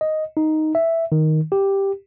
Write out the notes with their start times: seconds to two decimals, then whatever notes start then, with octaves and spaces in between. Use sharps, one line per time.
0.01 D#5
0.37 D#4
0.75 E5
1.12 D#3
1.52 G4